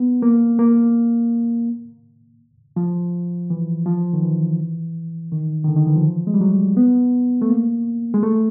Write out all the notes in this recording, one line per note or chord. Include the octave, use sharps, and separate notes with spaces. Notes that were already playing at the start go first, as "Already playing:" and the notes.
Already playing: B3
A#3
A#3
F3
E3
F3
D#3
E3
D#3
D#3
D3
D#3
E3
F3
G#3
G3
F#3
B3
A3
A#3
G#3
A3